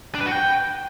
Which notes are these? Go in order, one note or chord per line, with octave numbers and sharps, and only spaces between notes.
D4
B4
F#4
G5